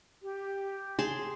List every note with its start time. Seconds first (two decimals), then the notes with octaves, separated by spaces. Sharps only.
0.23 G4
0.99 G#4 A5 C6